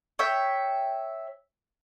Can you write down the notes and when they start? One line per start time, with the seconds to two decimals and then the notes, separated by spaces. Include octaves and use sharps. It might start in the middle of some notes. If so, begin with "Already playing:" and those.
0.19 C#5 E5 G5